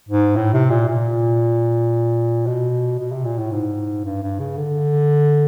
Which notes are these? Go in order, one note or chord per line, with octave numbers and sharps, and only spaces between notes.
G#2
A2
C3
A#2
A#2
B2
B2
C3
A#2
A2
G#2
G2
G2
C#3
D3